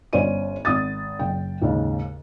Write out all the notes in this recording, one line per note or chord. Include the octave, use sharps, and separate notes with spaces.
G1 C#4 C5 D5 D#7
G#1 D#6 A6
F#1 G5
D#2 G#2 C#3